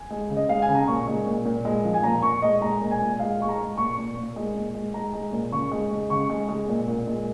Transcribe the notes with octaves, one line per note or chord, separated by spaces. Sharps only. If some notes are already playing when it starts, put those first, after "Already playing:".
Already playing: G#5
G#3
C#3
D#5
G#3 F5
G#5
C#3
A#5
A#2 C#6
G#3
A#2
A#2
G#3
F3
G#5
A#2 A#5
A#2 C#6
G#3 D#5
G#3 A#5
A#2
G#5
A#2
G#3 F5
G#3 C#6
A#5
G#3
A#2 C#6
A#2
A#2
G#3
A#2
G#3
G#3 A#5
G#3
A#2
C#3 C#6
G#3
G#3
C#3 C#6
G#3
G#3
A#2
A#2
G#3